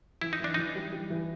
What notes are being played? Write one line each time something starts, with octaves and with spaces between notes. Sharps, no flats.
E3 E4
D#4
E3 D4
E3 D#4
G3
G3
E3